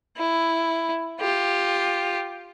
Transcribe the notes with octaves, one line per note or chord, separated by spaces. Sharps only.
E4
F4 G4